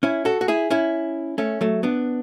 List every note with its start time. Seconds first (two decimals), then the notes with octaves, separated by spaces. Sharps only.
0.03 C#4 E4
0.25 F#4 A4
0.41 F#4
0.48 E4 G#4
0.70 C#4 E4
1.38 A3 C#4
1.61 F#3 A3
1.83 B3 D4